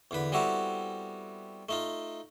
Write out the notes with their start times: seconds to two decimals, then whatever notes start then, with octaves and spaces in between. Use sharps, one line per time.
0.11 E2 D3 B4
0.32 G3 B3 C4 E4 F#4 A4
1.69 A3 D#4 F4